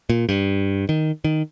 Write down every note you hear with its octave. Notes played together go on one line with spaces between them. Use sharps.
A#2
G2
D#3
D#3